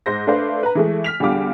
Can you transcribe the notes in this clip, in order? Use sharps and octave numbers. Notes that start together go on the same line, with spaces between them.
G#2 C5 A#6
A3 D4 B4 C5 F5
B4 A#5
E3 G#3 A3
F6 B6 F7
E2 D3 G3 F4 D6 F6